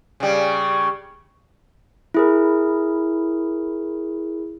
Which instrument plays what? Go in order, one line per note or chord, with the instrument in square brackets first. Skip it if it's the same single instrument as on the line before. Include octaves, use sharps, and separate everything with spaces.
[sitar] C#3 G3
[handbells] E4 G#4 A#4